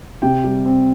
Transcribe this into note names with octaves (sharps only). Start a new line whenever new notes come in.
C3 G5
G3
C4